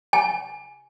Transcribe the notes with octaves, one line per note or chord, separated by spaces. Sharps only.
G#5